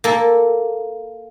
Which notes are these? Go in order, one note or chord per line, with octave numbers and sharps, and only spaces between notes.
A#3 A4